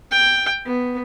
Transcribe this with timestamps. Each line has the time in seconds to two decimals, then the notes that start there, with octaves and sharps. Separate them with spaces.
0.11 G5
0.66 B3